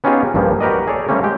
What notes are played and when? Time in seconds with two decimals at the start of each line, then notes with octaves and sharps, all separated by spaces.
0.04 B3 C#4 D#4 F4 G4 G#4
0.34 A#1 G2 A#2 F3
0.61 F#4 G4 A#4 B4 D5 D#5
0.88 G#4 A4 C#5 D5
1.09 G3 A3 A#3 C4 C#4
1.23 G#3 G4 G5